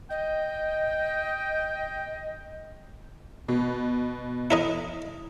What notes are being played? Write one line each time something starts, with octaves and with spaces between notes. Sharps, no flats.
D#5 G5
B2
E4 A#4 D#5